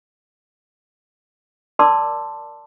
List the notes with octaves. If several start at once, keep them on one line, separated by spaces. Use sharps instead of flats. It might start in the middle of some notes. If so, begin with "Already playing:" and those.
A#4 D5 A5 C6 D6 E6